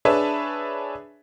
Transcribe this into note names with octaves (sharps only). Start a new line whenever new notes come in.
D4 G#4 B4 C#5 E5 A5